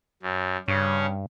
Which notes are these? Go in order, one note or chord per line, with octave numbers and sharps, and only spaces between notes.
F#2
G2 C#3 C#4